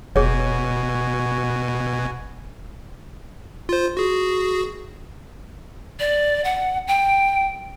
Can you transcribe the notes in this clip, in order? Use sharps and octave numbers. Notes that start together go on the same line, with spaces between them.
F1 B2 F#4 G#4 C#5 G#5
F4 C5
F#4 G#4
D5
F#5
G5